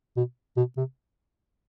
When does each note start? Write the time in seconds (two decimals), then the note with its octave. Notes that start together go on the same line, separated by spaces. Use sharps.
0.17 B2
0.57 B2
0.77 C3